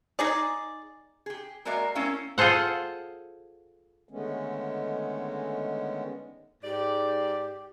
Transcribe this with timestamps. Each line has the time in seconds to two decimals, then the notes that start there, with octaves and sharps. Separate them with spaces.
0.19 D#4 G#4 D5
1.26 G4 G#4
1.65 G#3 A#3 F#4 A#4 D5 E5
1.95 A3 C4 C#4 E4 A#4 F5
2.38 F4 G#4 A4 C5 F#5
4.09 D3 D#3 G#3 A3 B3 C#4
6.63 G#2 G4 D5